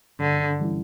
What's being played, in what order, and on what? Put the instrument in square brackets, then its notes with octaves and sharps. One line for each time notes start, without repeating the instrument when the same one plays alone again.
[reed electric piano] G2 [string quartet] D3
[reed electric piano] E3 G3 C#4 E4